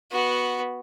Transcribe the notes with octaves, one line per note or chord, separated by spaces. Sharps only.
B3 F#4